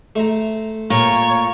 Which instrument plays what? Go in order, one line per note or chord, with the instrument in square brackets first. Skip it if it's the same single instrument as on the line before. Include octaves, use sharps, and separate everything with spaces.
[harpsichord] A3 C5 A#5
[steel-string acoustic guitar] A#2 [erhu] C#5